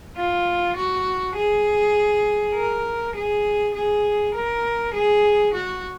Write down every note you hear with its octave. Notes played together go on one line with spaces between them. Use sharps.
F4
F#4
G#4
A#4
G#4
G#4
A#4
G#4
F#4